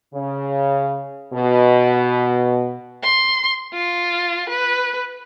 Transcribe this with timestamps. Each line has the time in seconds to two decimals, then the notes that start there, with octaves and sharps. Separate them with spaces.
0.14 C#3
1.34 B2
3.03 C6
3.74 F4
4.50 B4